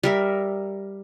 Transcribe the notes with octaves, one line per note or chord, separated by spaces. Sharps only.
G3 A#4 E5